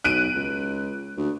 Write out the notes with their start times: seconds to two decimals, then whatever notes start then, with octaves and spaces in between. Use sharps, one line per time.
0.04 B1 F#6 D7 D#7
0.35 C#2
1.17 D2